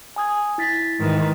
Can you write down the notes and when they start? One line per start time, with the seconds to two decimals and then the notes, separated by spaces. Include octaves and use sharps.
0.16 G#5 D#6 G#6
0.58 E4 A6 B6
0.99 G#2 D#3 E3